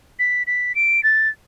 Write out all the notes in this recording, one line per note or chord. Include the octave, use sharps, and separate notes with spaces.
B6
B6
D7
A6